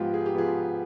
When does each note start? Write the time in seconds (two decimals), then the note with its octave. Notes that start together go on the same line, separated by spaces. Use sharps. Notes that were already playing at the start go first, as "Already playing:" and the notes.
Already playing: G#2 F3 B3 F4 G4
0.14 G#4
0.26 G4
0.35 F3 B3 F4 G#4